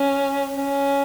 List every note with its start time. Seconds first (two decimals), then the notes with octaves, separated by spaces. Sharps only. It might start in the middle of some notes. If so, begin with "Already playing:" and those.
Already playing: C#4
0.57 C#4